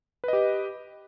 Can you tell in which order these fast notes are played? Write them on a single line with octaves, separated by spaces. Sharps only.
B4 D#5 G4